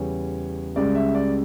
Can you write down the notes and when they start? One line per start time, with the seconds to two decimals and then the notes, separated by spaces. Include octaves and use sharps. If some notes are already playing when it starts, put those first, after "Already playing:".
Already playing: E2 C#3 E3 G3 C#5
0.76 C#2 C#3 G3 D5
0.95 E5
1.15 D5